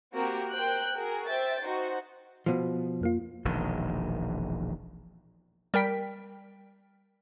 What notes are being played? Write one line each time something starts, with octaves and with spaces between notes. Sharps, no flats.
A#3 C4 F#4 G4 A#4
A#4 C5 G5 F#6
F#4 G#4 A#4
C5 E5 G5 A6
D#4 F#4 C5
B2 F3
F2 A#3 F4
E1 A#1 D#3
G3 A#4 G5 B6